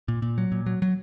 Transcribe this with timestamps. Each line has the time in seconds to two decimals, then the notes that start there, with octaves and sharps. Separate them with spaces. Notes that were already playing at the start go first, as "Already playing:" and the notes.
0.08 A#2
0.22 A#2
0.38 F#3
0.52 A#2
0.66 F#3
0.82 F#3